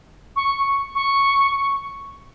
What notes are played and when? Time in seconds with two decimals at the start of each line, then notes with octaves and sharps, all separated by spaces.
0.36 C#6
0.95 C#6